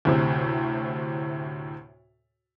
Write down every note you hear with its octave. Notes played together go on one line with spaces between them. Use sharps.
D2 A2 C3